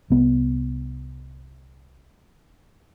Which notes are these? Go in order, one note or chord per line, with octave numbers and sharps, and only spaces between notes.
C2 B3